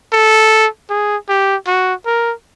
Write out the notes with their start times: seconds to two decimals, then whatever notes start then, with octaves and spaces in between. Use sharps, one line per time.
0.13 A4
0.90 G#4
1.29 G4
1.67 F#4
2.06 A#4